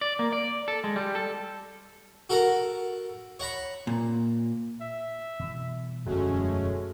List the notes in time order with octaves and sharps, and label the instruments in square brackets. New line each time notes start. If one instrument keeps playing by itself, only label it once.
[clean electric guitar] D5
A#3
D5
A4
G#3
G3
A4
[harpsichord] F#4 A4 A#4 F#5 A#5
C#5 F#5 A#5 B5
[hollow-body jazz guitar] A#2
[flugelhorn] E5
[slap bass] B2 E3 G3
[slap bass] E1 F#2 D3 [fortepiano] F#3 [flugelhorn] G#3 [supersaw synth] A3 C#4